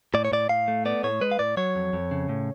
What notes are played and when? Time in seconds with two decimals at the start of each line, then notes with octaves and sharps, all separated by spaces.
0.14 A2 D5
0.25 C#5
0.32 A2 D5
0.49 A2 F5
0.68 A3
0.85 B3 D5
1.04 A2 C#5
1.21 G#3 B4
1.32 F5
1.39 A2 D5
1.57 F#3 C#5
1.76 F2
1.93 F2
2.11 C#3
2.29 A2